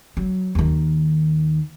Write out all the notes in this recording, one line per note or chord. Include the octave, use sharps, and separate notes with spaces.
F#3
D#2 D#3